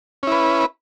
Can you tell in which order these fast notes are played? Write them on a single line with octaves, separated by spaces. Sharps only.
C#4 E4 B4